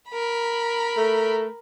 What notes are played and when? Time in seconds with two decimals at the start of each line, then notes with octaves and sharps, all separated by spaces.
0.10 A#4 B5
0.97 A3